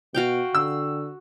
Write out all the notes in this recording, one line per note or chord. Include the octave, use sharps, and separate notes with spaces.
B2 F#4 F5 G5
D3 E6